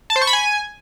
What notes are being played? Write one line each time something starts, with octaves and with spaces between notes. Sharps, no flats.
A5
C5
C#6
B5
G#5